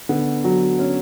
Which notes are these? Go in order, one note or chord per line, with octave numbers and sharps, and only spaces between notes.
D3 B3
F#3
C#4